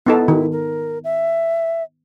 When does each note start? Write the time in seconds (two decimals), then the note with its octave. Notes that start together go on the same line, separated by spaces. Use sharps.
0.06 B3 D#4 E4 A4
0.28 D#3
0.52 A#4
1.04 E5